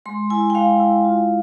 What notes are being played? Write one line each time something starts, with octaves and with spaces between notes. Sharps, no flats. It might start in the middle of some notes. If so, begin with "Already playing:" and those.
G#3 C6
E4 G#5
G5
G#3 F5
E4
F4